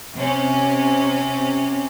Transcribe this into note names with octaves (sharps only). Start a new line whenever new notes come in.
C3 C#4